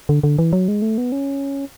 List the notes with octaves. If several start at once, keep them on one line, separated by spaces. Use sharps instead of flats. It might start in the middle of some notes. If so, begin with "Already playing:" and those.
D3
D3
E3
F#3
G#3
A3
B3
C#4